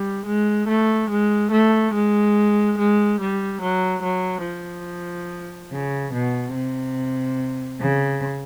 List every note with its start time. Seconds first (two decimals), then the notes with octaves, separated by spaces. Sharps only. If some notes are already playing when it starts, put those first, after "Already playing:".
Already playing: G3
0.25 G#3
0.67 A3
1.09 G#3
1.51 A3
1.93 G#3
2.77 G#3
3.19 G3
3.61 F#3
4.02 F#3
4.44 F3
5.71 C#3
6.12 B2
6.54 C3
7.80 C#3